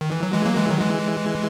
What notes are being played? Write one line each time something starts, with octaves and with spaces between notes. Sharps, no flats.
D#3
E3
F#3
E3 G#3
F#3 A#3
E3 G#3
D#3 F#3
E3 G#3